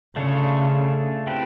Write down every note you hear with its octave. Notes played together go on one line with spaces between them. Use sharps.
C#3 A3 D4 F4 A4 C#5
A3 C4 E4 G4 B4